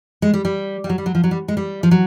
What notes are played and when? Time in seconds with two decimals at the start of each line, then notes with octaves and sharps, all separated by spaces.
0.22 G#3
0.34 G3
0.45 G3
0.84 G3
0.90 F#3
0.98 G3
1.06 F#3
1.15 F3
1.24 F#3
1.31 G3
1.48 G#3
1.57 G3
1.83 F3
1.91 F#3